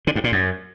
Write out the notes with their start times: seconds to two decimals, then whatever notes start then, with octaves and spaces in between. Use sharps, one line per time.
0.07 D3
0.16 G2
0.24 A#2
0.32 F#2